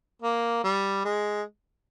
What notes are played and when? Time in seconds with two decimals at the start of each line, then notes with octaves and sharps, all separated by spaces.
0.22 A#3
0.64 G3
1.05 G#3